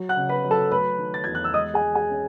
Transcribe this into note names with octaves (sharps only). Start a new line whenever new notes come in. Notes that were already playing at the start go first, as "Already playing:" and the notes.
Already playing: F#3
F#5 F#6
C#3
B4 B5
F#3
A4 A5
A3 B4 B5
D#3
A6
E2 G#6
F#6
E6
G#3 D#5 D#6
G#4 G#5
G#3
G#4 G#5
C#4